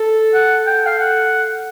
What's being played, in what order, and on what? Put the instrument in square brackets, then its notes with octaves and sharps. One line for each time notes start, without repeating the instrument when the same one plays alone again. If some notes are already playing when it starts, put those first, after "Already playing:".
Already playing: [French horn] A4
[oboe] F#5
G5
F5
F#5